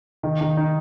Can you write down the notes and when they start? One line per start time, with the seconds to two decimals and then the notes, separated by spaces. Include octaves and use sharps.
0.23 D#3
0.41 D#3
0.57 D#4